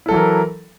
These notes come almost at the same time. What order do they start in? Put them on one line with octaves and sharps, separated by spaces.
E4 A4 F#3 E3 A#4